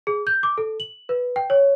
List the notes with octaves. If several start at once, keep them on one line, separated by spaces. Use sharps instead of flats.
G#4
G6
D6
A4
F#7
B4
G5
C#5